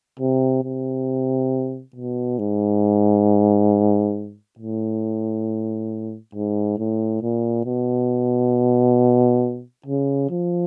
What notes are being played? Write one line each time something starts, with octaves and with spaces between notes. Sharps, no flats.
C3
C3
B2
G#2
A2
G#2
A2
A#2
B2
C#3
F3